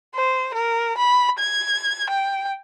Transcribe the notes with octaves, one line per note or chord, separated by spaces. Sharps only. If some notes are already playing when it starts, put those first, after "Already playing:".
C5
A#4
B5
G#6
G5